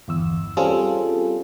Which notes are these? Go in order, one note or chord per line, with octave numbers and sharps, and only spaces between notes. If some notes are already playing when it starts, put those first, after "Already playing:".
G1 E2 E6
G3 C4 C#4 F4 G#4 A4